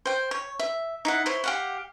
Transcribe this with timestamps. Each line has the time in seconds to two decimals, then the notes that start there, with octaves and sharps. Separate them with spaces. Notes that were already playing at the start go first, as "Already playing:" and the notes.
0.06 C5 G5
0.31 C#5
0.59 E5
1.05 D#4 E4 F#5
1.26 E4 C5 C#5
1.44 G4 F5 F#5